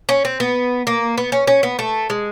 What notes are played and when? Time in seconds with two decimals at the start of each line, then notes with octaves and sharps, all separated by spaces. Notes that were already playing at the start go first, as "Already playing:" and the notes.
0.09 C#4
0.25 C4
0.40 B3
0.87 A#3
1.18 B3
1.32 C#4
1.47 C#4
1.63 B3
1.79 A3
2.10 G#3